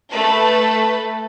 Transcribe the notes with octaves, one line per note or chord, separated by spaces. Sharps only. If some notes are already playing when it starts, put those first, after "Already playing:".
A3 A4 B4